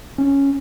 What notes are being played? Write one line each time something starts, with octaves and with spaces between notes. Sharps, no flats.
C#4